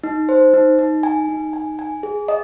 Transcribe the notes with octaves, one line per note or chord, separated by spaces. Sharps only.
D#4
C5
D#4
D#4
G#5
D#4
G#5
G#5
G#4
D#5